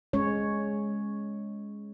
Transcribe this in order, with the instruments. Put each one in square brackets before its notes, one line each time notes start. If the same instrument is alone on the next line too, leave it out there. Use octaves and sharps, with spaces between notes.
[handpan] G#3 C#4 C#5